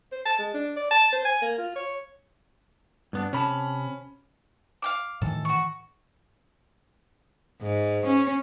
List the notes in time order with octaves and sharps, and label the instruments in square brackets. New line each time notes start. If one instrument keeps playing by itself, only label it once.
[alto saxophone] C5
A5
G#3
D4
D5
A5
C5
G#5
A#3
F4
C#5
[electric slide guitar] G2 B3 D4
[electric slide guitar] C3 A#4 A5 [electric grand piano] C#4 B5
[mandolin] F5 G5 D6
[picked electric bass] A2 D#3 E3 [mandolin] A4
[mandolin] F#4 C#6
[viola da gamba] G#2
C#4